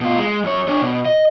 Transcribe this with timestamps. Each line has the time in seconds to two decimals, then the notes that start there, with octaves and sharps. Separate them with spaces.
0.01 B2 F4
0.18 G#3
0.44 F#2 C#5
0.68 D4 C#5
0.82 B2
1.06 D#5